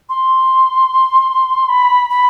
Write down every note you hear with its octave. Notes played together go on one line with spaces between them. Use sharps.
C6
B5
B5